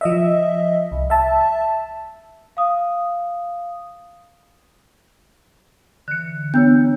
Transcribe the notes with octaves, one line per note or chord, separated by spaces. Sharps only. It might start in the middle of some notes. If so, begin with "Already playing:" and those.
F3 D#5 E5
C2
E5 A5
F5 D#6
D3 E3 F#6 C#7
B3 D4 C#5 E6 G6